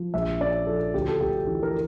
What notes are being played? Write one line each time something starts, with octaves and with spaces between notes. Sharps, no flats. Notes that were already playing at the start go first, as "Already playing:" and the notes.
Already playing: F3
A#1 E5
C#4 D5
F3 A4
D2 G4
A4
D2 G4
E3
A#4